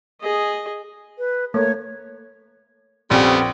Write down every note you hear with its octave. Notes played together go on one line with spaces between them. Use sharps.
G#4 D#5
B4
A3 A#3 C#5
A#1 F2 C#3 G3 B3 C4